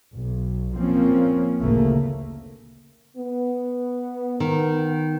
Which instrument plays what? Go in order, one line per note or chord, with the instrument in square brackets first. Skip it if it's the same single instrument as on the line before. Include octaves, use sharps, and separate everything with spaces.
[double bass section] B1
F3 A#3 C4 C#4
G#1 D2 A#2 C#3 A3 A#3
[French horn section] B3
[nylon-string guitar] D#3 [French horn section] B3